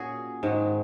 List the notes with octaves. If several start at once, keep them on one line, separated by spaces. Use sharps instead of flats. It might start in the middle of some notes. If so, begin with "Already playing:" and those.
Already playing: A#2 C#4 F#4 G#4
G#2 D#3 G#3